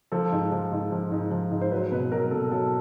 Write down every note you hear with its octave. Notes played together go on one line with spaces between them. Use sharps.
F3 A4
G#2
F3
G#2
F3
G#2
F3
G#2
C5
F#3 B4
B2 B4
F#3 A#4
B2 A4
F#3 A4